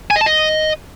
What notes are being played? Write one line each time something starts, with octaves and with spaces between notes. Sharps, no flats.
G#5
D#5
A5
D#5